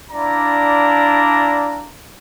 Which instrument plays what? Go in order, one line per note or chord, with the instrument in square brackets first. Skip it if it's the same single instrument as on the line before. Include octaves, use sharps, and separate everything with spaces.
[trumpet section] D4 E4 D5 F5 A#5